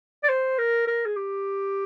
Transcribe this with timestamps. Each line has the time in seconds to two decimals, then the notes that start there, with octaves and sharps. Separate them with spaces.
0.24 D5
0.29 C5
0.58 A#4
0.87 A#4
1.06 G#4
1.16 G4